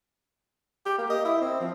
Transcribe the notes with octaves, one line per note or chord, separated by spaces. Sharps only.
G4
A#3
D#5
E4
C4
F3